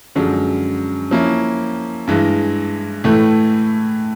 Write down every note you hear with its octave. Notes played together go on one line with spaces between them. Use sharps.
F#2 D3 F3 G#3
F3 A#3 C#4 E4
G2 E3 G#3
A2 E3 A3